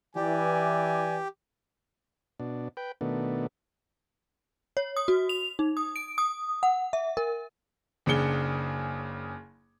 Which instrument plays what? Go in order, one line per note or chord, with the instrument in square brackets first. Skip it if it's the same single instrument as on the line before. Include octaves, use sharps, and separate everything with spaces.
[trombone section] E3 [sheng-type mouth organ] G4 [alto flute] D5 [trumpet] G#5
[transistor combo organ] B2 D4
B4 G5
B2 D#3 A3 B3 D4
[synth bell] C#5
D#6
F#4
F7
D#4
D#6
D7
D#6
F#5
E5
A#4
[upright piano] F#1 C#3 D4 G#4 C#7 G7